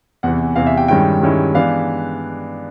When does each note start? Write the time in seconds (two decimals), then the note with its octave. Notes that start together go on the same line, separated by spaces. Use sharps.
0.23 E2 C3 E3 F#5
0.56 E2 C3 E3 F5
0.66 E5
0.77 G5
0.88 G2 D#3 G#3 C#4 E4 G5
1.21 G2 D#3 G#3 C#4 E4
1.55 E3 G#3 B3 D4 F5